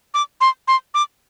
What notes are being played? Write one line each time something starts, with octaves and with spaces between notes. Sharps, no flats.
D6
C6
C6
D6